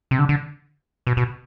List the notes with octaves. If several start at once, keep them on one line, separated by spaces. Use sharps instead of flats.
C3
D3
D3
B2
B2